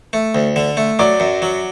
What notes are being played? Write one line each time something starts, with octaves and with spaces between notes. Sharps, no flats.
A3
D2
D3
A3
F#3 D5
F#2
F#3